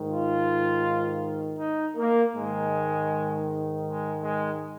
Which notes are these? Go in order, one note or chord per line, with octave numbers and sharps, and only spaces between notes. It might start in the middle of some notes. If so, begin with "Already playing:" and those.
Already playing: G#2 D#3
F4
D#4
A#3
G#2 D#3 G#3
G#3
G#3